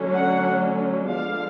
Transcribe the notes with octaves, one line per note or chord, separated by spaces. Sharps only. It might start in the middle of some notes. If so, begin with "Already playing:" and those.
Already playing: D3 F#3 A3 C#4
F#5
D3 F3 G#3 B3 D4 F5